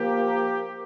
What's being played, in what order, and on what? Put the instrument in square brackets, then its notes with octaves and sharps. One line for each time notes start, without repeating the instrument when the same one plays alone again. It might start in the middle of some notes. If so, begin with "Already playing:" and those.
Already playing: [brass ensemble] F3 A#3 G4 A#4